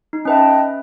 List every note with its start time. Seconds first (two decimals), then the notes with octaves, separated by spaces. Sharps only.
0.13 D#4
0.25 C#4 B4 D#5 E5 G5 A5